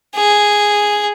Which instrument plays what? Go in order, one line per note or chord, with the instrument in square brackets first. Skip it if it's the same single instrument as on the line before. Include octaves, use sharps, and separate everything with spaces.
[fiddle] G#4